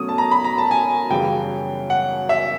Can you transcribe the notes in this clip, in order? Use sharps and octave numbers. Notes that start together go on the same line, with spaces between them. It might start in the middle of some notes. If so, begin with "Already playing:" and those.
Already playing: B2 F#3 A3 C#4 D#6
A5
A#5
B5
A#5
A5
G#5
F#2 C#3 E3 G3 G5
F#5
E5